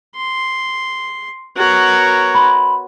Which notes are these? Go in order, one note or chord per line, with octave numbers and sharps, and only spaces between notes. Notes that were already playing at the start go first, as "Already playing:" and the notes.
C6
B3 F#4 A#4 C#5
B5 C6